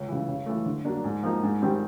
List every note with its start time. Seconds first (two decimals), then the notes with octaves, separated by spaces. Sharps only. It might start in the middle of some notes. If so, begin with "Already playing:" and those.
Already playing: C#2
0.09 C#3 E3
0.28 C#3
0.46 E3 A3
0.66 D3
0.85 F#3 A#3 D4
1.04 G#2
1.23 F3 A#3 D#4
1.43 G#2
1.62 D#3 G3 C4